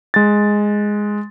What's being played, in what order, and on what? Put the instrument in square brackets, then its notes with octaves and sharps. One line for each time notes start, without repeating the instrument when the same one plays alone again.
[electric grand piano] G#3 A6